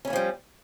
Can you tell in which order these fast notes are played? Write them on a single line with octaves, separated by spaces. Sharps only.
C#4 E3 A#3 F3 G3